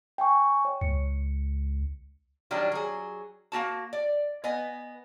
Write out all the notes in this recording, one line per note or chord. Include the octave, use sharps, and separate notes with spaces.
G5 G#5 C#6
C#5
C#2 C#7
D#3 F#3 G3 D4
F#3 G#4
A#3 C#4 F#4 A5
D5
B3 D#5 G#5